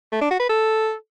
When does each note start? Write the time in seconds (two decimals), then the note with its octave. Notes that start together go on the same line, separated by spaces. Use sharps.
0.12 A3
0.21 D4
0.31 F#4
0.40 B4
0.49 A4